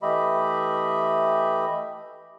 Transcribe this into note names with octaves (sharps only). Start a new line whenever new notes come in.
E3 A3 G4 D#5 E5 B5